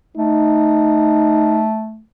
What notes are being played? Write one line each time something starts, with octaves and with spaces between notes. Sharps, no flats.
A3 D#4